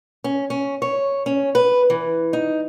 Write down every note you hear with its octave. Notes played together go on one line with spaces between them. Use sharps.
C#4
C#4
C#5
C#4
B4
E3
D#4